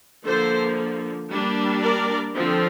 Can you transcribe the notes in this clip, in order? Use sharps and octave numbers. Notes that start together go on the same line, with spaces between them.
D3 F3 A#3 A4 C5
G3 A#3 D4
A#4 D5
D3 F3 C4